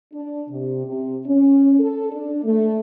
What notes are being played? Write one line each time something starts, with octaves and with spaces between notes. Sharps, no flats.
D4
C3
C3
C#4
A4
D4
A3